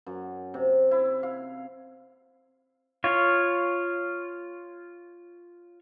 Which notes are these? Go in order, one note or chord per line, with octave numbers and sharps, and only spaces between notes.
F#2
C3
E4
F5
F4 C#5